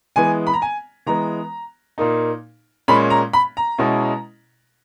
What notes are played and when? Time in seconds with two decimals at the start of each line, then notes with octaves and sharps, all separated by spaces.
0.16 E3 G#3 B3 G#5
0.47 B5
0.53 A#5
0.62 G#5
1.06 E3 G#3 B3 A#5
1.98 A#2 A#3 D#4
2.88 A#2 G#3 C#4 B5
3.10 A#5
3.33 B5
3.57 A#5
3.78 B2 G#3 C#4 E4